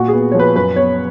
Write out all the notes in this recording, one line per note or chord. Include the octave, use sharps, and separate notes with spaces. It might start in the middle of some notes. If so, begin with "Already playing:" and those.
Already playing: A#2 F#4
B3 G#4
F3 C#5
B4
F#2 B4
B3 C#5